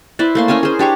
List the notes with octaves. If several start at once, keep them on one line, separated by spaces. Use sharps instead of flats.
E4 B4 C5 D5
A3 A#3 C6
C#4 A#4 G#5 A5
G#4 C5
D4 G4 C#5 C#6